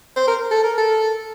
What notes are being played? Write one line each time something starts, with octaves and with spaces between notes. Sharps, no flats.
C5
A#4
A4
A#4
A4